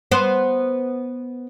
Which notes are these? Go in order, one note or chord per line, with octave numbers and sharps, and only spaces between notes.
B3 C5